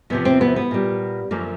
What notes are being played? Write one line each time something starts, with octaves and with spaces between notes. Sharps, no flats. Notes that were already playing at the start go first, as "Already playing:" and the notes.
E2 C3 F3 B3
C4
B3
B3
A#2 G3
F#2 D3 F3 A3 A#3